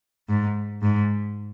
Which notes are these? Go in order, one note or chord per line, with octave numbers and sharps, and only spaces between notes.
G#2
G#2